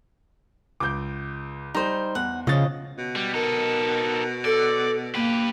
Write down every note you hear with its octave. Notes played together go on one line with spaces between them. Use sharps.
C#2 D6 G6
G3 D#4 C5
E2 F#5
C#3 F3 C#5 D#5 F5 A6
B2
G3
D#4 A4 A#4
A4 D5
A#3 G4 B4